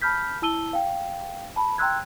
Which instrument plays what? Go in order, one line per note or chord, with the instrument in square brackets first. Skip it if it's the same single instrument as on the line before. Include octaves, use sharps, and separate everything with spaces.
[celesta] A5 B5 F6 G6 B6
E4 A5 E6 D#7 G7
F5 G5
A5 B5
G5 A#5 C6 E6 F#6 G#6